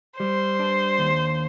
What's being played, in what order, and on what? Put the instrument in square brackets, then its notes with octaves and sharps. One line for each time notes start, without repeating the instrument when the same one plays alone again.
[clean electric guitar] G3 [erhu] C5
[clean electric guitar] D4
D#2